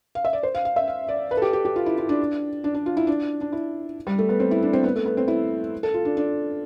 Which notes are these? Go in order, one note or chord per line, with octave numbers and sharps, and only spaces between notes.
F5
E5
D5
C5
F5
F5
E5
F5
D5
B4
A4
G4
G4
G4
F4
E4
E4
D4
D4
D4
F4
E4
D4
D4
E4
G3
A3
B3
C4
E4
D4
C4
B3
A3
B3
C4
E4
A4
F4
D4
D4